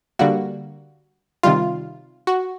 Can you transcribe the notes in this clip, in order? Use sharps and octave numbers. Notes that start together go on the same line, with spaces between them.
D3 G3 A#3 F#4
C3 D#3 G3 F4
F#4